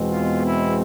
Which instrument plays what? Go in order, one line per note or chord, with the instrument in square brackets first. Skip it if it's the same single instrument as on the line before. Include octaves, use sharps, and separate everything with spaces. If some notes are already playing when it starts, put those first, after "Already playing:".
Already playing: [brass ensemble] E2 B2 G#3 C4
F4
E4